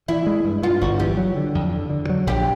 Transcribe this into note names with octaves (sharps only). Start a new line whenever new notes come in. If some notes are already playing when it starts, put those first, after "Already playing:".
E3 E4
G#3
G2
G2 F4
G1 F#4
E3 G4
F#3
D3
F2
D3
D3
F#3
A#1 G4